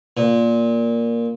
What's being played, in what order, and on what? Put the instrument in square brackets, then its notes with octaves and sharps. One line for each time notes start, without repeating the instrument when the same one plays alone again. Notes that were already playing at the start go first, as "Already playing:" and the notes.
[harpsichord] A#2